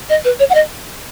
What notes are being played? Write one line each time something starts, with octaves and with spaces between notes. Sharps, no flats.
D#5
B4
C#5
F#5
D#5